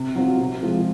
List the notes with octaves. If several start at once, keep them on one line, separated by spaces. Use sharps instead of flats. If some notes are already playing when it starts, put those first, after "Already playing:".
Already playing: C3
F#3 C4 F4
C3
F3 G#3